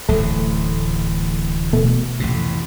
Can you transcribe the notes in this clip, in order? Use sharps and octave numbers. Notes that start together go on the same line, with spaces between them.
D1 A1 F#3 A3
B2 A3
A1 F2 C3